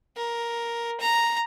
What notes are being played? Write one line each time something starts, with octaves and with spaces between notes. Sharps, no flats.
A#4
A#5